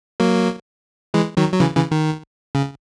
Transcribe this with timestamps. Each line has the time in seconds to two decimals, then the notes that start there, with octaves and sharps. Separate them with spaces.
0.20 F#3 A#3
1.14 E3 G#3
1.37 D#3 F#3
1.54 F#3
1.60 C#3 E3
1.75 C#3 E3
1.91 D#3
2.55 C#3